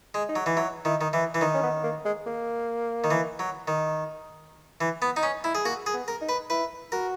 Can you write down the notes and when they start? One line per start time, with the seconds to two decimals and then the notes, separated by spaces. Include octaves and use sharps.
0.14 G#3
0.29 D#4
0.36 F#3
0.46 E3
0.57 F#3 E4
0.85 D#3 E4
1.01 D#3
1.13 E3 E4
1.34 E3
1.41 D#3 D#4
1.54 C#4
1.63 B3
1.83 A#3
2.05 G#3
2.26 A#3
3.04 D#3
3.11 E3
3.39 F#3
3.68 D#3
4.81 E3
5.02 B3
5.16 D#4
5.23 C#4
5.44 E4
5.55 G#4
5.65 A#3 F#4
5.86 G#4
5.94 B3
6.08 A#4
6.22 D#4
6.29 B4
6.50 E4 B4
6.92 F#4 A#4